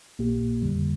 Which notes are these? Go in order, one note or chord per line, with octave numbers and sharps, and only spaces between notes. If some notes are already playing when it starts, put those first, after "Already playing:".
A#1 A#2 A#3 G4
F2 D3 G3